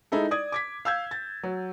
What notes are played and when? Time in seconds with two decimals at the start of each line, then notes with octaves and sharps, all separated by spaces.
0.12 G#3 D#4 E4 A4
0.31 D5 D#6 G#6
0.52 D6 G#6 B6
0.85 F5 E6 G6 G#6
1.11 A6
1.43 F#3